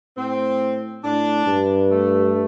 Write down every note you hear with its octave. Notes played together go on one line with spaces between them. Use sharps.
A2 C4
A2 D4
G2
A3